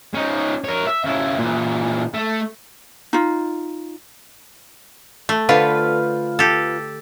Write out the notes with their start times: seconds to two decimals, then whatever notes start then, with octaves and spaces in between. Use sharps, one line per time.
0.14 C#4 D#4
0.64 A#4 C#5
0.87 E5
1.04 C#3 E4
1.38 A#2 E3
2.14 A3
3.13 D#4 F4
5.29 A3
5.49 D3 F4 B4 C5
6.39 G4 A4